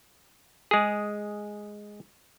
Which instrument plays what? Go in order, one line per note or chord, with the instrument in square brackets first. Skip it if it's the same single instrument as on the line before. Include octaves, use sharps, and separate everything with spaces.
[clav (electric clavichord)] G#3 G#4